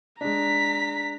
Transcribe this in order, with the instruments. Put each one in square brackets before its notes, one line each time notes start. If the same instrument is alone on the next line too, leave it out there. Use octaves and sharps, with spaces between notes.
[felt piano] G#3 D4 [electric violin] A#5 B6